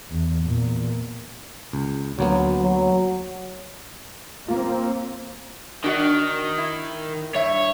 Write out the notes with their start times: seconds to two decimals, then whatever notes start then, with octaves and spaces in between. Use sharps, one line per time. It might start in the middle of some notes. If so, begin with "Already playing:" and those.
0.11 E2
0.43 E2 A#2
1.73 C#2
2.19 D2 F#3 A#3 B3
2.62 F#3
4.49 A#3 C4 F4
5.84 D#3 D4 F#4 D#5
6.58 E4
7.35 G2 C#5 E5